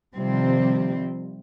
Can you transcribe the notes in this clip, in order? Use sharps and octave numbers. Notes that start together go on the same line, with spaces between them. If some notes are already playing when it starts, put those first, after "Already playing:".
C3 D#3 F3 G3 C4